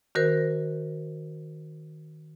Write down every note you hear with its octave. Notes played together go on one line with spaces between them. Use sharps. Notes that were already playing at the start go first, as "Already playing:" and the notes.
D#3 F#4 A#4 C5